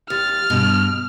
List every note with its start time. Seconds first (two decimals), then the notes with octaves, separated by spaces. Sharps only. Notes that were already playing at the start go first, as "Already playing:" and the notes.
0.10 D#2 F6 A6
0.50 G2 B2